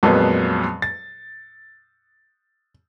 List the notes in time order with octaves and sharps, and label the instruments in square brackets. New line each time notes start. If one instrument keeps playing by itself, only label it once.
[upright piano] F2 A#2 F3 F#3 G#3 B3
A6